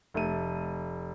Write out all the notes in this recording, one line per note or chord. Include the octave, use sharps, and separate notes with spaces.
F1 A3 D#7